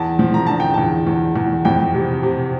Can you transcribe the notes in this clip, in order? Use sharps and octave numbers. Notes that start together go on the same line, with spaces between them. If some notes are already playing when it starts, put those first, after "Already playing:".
Already playing: E2 A5
F3
A#5
D3 A5
G5
E2 A5
E2
E2
F2 G5
C3
C3